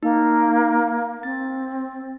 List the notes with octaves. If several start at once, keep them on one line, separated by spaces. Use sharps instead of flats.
A#3 D#4
C4 A6